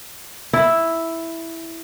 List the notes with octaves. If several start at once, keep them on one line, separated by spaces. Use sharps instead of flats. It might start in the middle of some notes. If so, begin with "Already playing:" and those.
E4